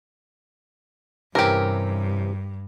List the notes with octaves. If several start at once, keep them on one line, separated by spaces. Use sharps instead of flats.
G2 C3 E3 C#4 G4 A#4